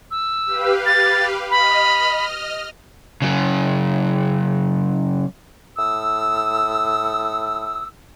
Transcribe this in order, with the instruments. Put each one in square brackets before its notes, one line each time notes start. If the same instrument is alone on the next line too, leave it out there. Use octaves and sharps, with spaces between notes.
[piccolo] E6
[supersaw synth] G4 B4 F5
[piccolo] A6
[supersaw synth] D#5 F6 [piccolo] B5
[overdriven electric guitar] C#3 F#3
[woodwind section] A2 D#6 E6